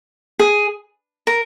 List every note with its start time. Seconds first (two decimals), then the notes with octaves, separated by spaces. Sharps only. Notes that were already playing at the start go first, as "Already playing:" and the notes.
0.39 G#4
1.27 A#4